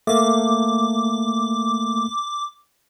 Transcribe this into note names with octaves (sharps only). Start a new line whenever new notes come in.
A3 A#3 D6